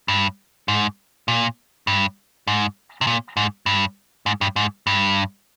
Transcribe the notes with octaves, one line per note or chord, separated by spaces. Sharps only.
G2
G#2
A#2
G2
G#2
C3
A#2
G#2
G2
G#2
G2
G#2
G2